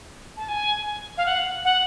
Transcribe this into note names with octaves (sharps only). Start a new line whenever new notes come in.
A5
G#5
F5
F#5
F#5